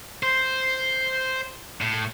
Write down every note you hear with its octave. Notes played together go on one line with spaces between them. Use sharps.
C5
A2